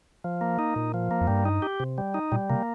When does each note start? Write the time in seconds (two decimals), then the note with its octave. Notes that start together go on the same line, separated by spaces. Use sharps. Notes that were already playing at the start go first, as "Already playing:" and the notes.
0.24 F3
0.41 A#3
0.59 D#4
0.76 A#2
0.94 F3
1.11 A#3
1.21 F2
1.27 G2 G3
1.45 D#4
1.62 G4
1.80 C3
1.98 G3
2.14 D#4
2.32 A#2 G3
2.50 C3 A#3